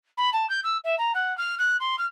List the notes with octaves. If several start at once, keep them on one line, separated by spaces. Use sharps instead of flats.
B5
A5
G6
E6
E5
A#5
F#5
F6
F#6
C6
F6